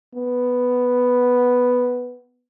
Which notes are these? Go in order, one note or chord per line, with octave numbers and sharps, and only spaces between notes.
B3